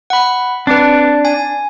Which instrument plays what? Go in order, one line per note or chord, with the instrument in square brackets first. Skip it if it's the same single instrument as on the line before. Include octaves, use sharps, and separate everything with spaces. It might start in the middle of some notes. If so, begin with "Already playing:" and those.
[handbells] F#5 B5
[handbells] C4 B4 [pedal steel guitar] D4
[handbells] G#5